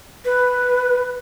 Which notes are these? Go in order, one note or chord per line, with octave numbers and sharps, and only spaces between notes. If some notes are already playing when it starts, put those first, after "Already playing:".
B4